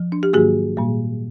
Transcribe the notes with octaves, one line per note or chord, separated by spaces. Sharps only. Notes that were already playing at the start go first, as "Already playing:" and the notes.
Already playing: F3
D4
G4
G#2 D#3 F#3 A#3 F#4 G#4
A#2 G3 A#3